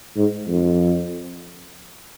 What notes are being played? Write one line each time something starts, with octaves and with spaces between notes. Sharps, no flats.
G#2
F2